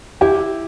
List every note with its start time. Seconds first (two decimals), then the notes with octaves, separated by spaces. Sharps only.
0.21 E4 G4